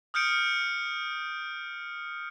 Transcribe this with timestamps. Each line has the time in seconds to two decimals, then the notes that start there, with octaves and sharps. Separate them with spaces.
0.14 D#6 F6 G6 C#7 D7